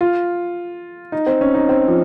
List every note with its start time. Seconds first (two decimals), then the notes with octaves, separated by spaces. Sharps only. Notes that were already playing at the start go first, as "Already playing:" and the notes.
0.01 F4
1.12 D#4
1.27 C4
1.41 C#4
1.54 D#4
1.69 C4
1.88 F3